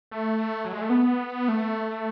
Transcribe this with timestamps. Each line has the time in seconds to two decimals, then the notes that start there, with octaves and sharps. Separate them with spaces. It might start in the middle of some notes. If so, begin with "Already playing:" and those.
0.11 A3
0.65 F#3
0.73 G#3
0.81 A3
0.90 B3
1.48 A3